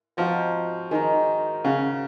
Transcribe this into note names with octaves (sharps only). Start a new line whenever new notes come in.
F3 C4 D#4 F#4 C5
D#3 G#3 D#4 A#4
C#3 C#4 F#4 C#5 F5